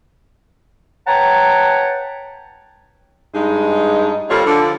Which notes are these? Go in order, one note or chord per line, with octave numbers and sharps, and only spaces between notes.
B4 C#5 F#5 G5 A5 A#5
G2 G#3 D#4
G3 A#3 C4 F4 A4 C#5
D3 F3